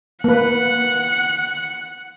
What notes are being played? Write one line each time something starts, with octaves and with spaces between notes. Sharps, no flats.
A#3 B4 F#5